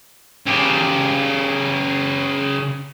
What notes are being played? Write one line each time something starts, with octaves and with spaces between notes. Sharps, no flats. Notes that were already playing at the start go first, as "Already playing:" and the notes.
C#3 G4